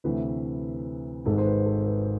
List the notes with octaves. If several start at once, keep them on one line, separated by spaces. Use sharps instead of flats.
D2 C3 E3 A3 B4
G#1 G#2 G#3 A4
C5
B4
A4
B4